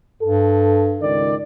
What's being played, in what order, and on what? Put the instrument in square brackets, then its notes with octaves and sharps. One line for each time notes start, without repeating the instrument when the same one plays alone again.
[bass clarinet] G2 [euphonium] A4
[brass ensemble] C#2 D#3 D5